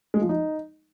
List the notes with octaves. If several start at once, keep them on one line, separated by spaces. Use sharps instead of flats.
G#3
F3
D#4